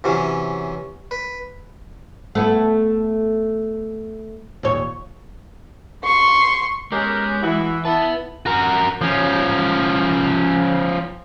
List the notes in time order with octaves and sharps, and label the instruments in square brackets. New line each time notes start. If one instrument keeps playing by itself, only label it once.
[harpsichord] C3 E3 F#3 C#4
B4
[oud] A3 B3 E4
D#2 A#2 C#5
[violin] C6 C#6
[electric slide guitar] G#3 [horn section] B3 C#4 G4 [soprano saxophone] A#4
[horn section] E3 [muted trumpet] E4 [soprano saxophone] F#4
[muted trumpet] E4 [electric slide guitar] B4 F#5 [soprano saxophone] A5
[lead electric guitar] F#4 A#4
F3 C#4